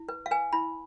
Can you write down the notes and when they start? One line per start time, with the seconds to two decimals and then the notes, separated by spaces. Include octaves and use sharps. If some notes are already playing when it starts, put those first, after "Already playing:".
Already playing: E4
0.09 B4
0.26 F5
0.31 B4 G#5
0.53 E4 B5